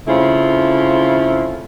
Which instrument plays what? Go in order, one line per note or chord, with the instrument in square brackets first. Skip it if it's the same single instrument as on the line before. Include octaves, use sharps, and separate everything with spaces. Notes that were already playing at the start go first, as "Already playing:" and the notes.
[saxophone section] C#3 A3 C4 E4 F4